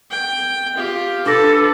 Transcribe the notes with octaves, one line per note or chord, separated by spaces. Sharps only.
G5
F4 G4
D4 A4 B4 D6 A#6